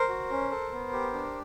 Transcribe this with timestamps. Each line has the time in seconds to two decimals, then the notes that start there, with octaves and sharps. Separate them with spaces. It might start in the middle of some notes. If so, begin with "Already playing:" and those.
Already playing: A#4 C5
0.09 F#4
0.31 C#4
0.51 A4
0.72 B3
0.93 G4
1.13 D4